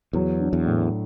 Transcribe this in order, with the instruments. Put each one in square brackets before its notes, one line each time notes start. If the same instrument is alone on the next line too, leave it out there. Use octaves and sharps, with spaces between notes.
[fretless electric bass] E2 [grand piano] F#3
[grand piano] D4
[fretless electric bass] E2
[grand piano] A2